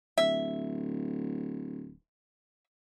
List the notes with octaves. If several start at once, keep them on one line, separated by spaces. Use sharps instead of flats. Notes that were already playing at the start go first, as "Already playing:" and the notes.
D1 E5